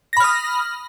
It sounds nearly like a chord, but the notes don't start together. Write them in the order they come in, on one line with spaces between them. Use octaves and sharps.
A#6 B5 F6 D#6